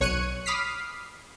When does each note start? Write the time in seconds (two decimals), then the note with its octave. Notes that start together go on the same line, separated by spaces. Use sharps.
0.01 B1 C#5 C#6 F#6 C#7 D#7
0.46 B5 D6 D#6 F6 B6 C7